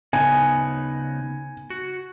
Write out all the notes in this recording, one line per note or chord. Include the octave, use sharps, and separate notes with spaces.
C#3 B3 D#4 G#5
F#4